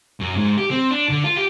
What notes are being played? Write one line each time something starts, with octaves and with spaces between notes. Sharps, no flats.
F#2
G#2
G4
C4
D4
D3
F4
G4